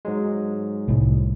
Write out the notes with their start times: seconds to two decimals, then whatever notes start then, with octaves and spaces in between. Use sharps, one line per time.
0.05 G#2 F#3 G#3
0.88 C2 A2